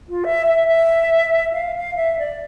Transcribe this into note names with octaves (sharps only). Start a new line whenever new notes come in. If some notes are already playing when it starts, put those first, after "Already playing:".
F4
E5
E5
E5
F5
F5
E5
D5